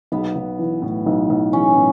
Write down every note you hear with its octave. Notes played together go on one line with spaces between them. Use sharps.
B1 B3
B1
E3
A2
B1
B1
E3 C#4
A2